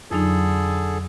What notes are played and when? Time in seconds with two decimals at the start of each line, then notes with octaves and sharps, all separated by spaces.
0.11 F2 D3 F#3 D#4 G#4 A4